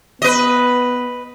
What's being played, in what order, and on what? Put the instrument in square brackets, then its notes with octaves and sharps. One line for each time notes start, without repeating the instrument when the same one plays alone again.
[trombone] B3 [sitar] B4 D#5